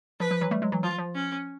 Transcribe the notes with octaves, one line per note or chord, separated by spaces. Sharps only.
F3 B4
F3
E3 F#3
G3 A3
F#3 G#3
E3 F#3
F3 F4
F3
C#4